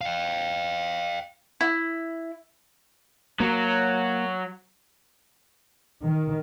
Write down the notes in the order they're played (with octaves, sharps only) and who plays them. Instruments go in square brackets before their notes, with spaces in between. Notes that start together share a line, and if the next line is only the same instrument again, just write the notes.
[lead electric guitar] F5 G5
[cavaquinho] E4
[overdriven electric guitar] F#3 [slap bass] A#3
[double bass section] D#3